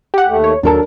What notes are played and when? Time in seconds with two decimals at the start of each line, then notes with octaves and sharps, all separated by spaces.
0.14 G4 F#5
0.27 D#2 A3
0.44 C#5
0.63 D#2 F#3 D4 A4 A#4